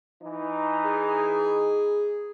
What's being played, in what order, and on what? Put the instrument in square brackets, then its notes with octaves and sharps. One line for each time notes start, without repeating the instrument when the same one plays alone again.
[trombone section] E3 D#4
[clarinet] G#4